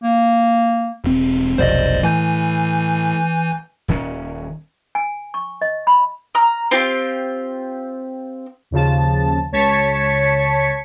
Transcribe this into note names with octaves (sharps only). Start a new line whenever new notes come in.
A#3
E1 C4
F1 B1 C5 D5 D#5
A2 E3 G#5 G6
D#1 D#3 C#4
G#5
C#6
D#5
B5
A#5 F6
C4 F4 G4
D#2 C#3 F3 A5
C#2 C#5 A5 G#6 B6 C#7